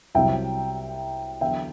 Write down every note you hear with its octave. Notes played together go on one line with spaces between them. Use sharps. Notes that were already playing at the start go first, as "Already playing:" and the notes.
C2 C3 F#3 E5 G5
E2 D3 F#3 E5 G5